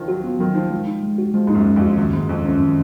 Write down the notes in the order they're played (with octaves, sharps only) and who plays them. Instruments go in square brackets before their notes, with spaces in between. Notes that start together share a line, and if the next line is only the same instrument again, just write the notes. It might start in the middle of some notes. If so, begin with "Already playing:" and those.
Already playing: [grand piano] D#3 F3
[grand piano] F#3 [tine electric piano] F#4
[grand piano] F3 [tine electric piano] B3
[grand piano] D#3 [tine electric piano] F#3
[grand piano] F3 [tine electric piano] D#4
[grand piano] F3 [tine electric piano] G#3
[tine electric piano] D#4
G#3
F#4
[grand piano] F3 [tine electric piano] G#3
[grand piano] G#2 [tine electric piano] D#4
[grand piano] F#2
[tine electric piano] G#3
[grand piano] F2
[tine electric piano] F#4
[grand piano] F#2 [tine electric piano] D#3
[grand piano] G#2 [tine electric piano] G#3
[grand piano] F2 [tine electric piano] D#3
[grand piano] F#2 [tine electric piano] C#4
[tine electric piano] D#3